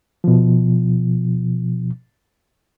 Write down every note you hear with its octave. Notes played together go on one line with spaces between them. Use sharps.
B2 F3